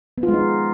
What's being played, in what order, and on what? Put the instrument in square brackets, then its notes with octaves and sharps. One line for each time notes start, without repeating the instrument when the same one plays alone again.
[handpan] B3
F4
G#3
D#4